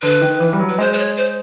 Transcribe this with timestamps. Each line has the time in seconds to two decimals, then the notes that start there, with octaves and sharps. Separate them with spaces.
0.02 D3 B4
0.21 D#3
0.40 E3
0.53 G3
0.59 F#3
0.69 B4
0.78 G#3 C5
0.93 C5
0.98 C#5
1.16 C5